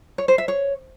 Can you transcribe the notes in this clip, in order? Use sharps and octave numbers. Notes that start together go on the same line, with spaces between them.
C#5
C5
E5
C#5